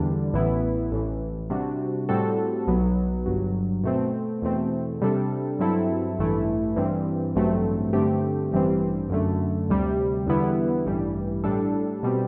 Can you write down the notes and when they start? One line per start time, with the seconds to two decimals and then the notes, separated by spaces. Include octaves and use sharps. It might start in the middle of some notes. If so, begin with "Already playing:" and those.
Already playing: E2 D3 G3 D4
0.34 A1 A2 E3 B3 E4
0.91 A1 A2 E3
1.50 C3 G3 D4 F#4
2.09 A2 G3 C4 F#4 A4
2.67 B1 B2 F#3 B3
3.26 G1 G2 F#3
3.84 B2 A3 C4
4.42 E2 B2 A3 C4
5.02 C3 G3 D4 A4
5.59 G2 F#3 C4 E4 A4
6.18 A1 G2 E3 A3 E4
6.76 G2 E3 G3 C4
7.35 A1 G2 F#3 A3 C4
7.93 G2 D3 A3 C4 G4
8.52 A1 G2 E3 G3 C4
9.10 F#2 D3 A3
9.69 D2 C3 G3
10.27 E2 D3 G3 B3 E4
10.86 A1 G2 E3 G3
11.44 A2 G3 D4 A4
12.03 B2 G3 C4